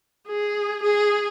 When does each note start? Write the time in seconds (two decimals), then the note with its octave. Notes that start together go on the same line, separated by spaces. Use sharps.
0.28 G#4
0.83 G#4